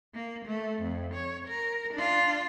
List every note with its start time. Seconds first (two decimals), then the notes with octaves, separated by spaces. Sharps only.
0.14 A#3
0.46 A3
0.82 F2
1.15 C#5
1.49 A#4
1.94 D4 F4